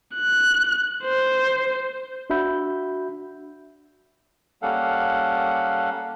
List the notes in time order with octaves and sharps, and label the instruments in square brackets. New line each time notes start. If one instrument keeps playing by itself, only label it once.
[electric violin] F#6
C5
[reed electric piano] D4 F#4 E5 B5 G6
[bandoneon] G3 A#3 C#4 A4 F5 F#5